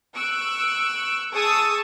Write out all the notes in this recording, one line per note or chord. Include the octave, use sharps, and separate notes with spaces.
C#6 E6 F#6 D7
G#4 A5 C#6 D#6 E6